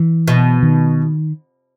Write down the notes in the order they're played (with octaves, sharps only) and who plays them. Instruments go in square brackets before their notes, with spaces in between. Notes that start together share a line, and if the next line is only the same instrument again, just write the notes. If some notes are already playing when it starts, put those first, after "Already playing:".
Already playing: [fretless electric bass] E3
[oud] B2
[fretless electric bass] D#3